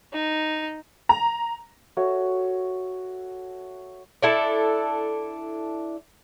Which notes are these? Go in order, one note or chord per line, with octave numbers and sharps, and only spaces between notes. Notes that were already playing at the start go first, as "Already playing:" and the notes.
D#4
A#5
F#4 A4 C#5 E5
D4 E4 A4